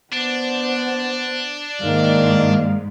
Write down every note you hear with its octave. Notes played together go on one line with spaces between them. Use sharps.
B3 D4 C5
G#2 D#3 A#3 D5 F5